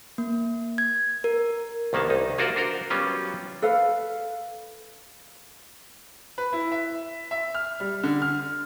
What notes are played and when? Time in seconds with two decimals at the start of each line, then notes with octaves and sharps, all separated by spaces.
0.18 A#3
0.78 G#6
1.24 A#4
1.93 C2 D#3 A#3 B3 A5
2.10 C2 D#4
2.38 A#3 F4 F#4 A#4 C5 D5
2.56 D4 F#4 A#4 C5
2.90 F#3 G3 B3 C#4 F4
3.62 A4 B4 F5
6.38 B4
6.53 E4
6.72 E5
7.31 E5
7.54 F6
7.80 G3
8.03 D3
8.22 F6